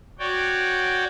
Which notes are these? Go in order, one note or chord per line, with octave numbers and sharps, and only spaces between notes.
F#4 C#5 D5 G5